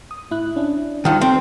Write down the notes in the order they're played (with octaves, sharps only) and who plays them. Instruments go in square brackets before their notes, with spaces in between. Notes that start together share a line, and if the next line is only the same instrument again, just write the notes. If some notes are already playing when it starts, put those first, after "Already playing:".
[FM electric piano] D#6
A2 E4 F#6
C#4 D4 E4
[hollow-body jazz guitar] D2 D#3 [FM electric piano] G3 F4
[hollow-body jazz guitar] C4 [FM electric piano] A4 G5